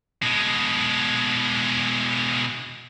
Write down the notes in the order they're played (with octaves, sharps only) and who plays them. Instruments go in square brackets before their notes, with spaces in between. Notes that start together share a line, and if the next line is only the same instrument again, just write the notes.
[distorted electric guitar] B2 G#3